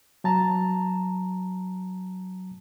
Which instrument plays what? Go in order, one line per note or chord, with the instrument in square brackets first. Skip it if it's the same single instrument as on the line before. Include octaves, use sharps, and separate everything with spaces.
[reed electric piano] F#3 A5 A#5